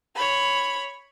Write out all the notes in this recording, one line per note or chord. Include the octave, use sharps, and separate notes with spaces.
C#5 B5